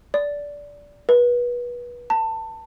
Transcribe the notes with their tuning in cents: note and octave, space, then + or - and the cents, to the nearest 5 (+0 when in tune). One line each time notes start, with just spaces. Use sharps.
D5 -15
B4 -25
A5 +20